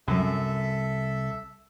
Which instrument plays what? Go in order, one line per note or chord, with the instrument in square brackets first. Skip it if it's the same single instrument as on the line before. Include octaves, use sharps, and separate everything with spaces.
[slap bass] C2 [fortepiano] F#2 [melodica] A4 E5